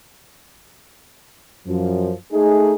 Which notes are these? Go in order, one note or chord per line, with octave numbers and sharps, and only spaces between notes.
F#2 F3
A3 D#4 G#4